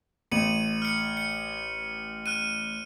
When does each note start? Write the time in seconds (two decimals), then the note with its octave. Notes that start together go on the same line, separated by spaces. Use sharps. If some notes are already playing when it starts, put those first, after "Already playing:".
0.32 A1 C#7 D#7 F#7
0.82 F6 C#7
1.17 C#7
2.26 F6 F#6 D#7